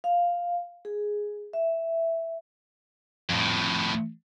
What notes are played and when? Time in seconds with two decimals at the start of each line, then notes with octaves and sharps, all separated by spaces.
0.04 F5
0.85 G#4
1.53 E5
3.30 F2 A2